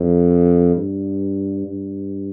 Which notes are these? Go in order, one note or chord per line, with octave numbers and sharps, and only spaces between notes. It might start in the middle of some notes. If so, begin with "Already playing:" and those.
Already playing: F2
G2
G2